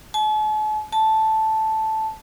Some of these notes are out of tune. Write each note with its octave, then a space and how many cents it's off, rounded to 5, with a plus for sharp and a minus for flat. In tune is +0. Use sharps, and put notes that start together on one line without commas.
A5 -45
A5 -5